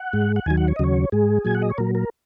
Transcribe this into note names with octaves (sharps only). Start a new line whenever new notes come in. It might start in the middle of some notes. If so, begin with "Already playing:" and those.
Already playing: F#5
G#2 G#3
F#5
D#2 D#3 F#3 G#5
F#5
C#5
D#5
D#2 C#3 F#3 C#5
G#2 G#3 G#4
A#2 F#3 G#5
F#5
D#5
C#5
A#2 F#3 A#4
A#4